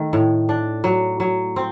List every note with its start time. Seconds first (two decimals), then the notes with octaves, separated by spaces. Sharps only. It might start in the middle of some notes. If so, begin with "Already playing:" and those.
Already playing: D#3 A3
0.13 A2
0.49 D4
0.84 F#3
1.20 F#3
1.56 C4